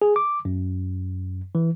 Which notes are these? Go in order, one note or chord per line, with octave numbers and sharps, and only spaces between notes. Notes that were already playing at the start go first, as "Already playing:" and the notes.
G#4
D6
F#2
E3